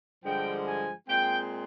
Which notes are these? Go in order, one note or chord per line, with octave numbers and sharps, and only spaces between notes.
G2 D3 F3 G#3 G5
G#5
A#2 G#3 C4 G5